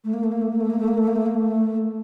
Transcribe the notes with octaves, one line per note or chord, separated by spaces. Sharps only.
A3
A#3
A3
A#3
A3
A#3
A3
A#3
A3
A#3
A3
A#3
A3
A#3
A3